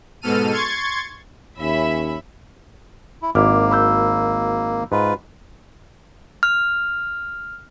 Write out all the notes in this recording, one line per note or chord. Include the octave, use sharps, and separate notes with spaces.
G#2 B2 A4 F6 D#7
C6 C#6 G#6 A6
D#2 C#4 E5 B5
E4
G#1 A#3 E4 D6 F6
B5 E6 G6
G#2 F4 B4
F6